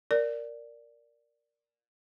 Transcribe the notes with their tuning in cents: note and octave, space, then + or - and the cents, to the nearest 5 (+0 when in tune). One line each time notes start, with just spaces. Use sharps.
A#4 +0 D5 +0